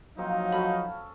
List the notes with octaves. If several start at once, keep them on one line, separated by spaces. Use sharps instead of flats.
F3 F#3 A#3 C4 D#4 A#4 F5
C#4 F#4 A4 B5